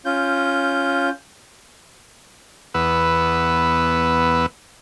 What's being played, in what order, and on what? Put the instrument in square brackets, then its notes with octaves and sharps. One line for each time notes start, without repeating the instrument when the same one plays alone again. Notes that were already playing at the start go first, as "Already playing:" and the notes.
[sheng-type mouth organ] C#4 F4 G6
[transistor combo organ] E2 B3 B4 E6